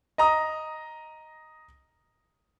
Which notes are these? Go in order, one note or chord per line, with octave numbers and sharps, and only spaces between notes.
D#5 A#5 D#6